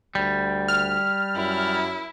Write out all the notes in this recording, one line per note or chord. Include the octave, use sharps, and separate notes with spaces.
D2 G3
F6
F#2 E4